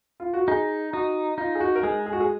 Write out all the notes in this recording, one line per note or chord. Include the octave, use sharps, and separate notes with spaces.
F4
F#4
D#4 G#4
D#4 F#4
D#4 F4
G#4
F#4
A#4
G#3 G#4
G#4
F#4
G#4